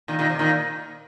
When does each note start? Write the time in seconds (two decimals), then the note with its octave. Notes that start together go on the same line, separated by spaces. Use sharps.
0.08 A#2 D#3
0.19 A#2 D#3
0.29 C3
0.39 A#2 D#3